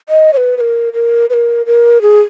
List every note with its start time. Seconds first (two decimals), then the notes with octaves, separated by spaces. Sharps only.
0.09 D#5
0.33 C#5
0.37 B4
0.57 B4
0.61 A#4
0.93 A#4
1.30 B4
1.34 A#4
1.66 A#4
2.02 G#4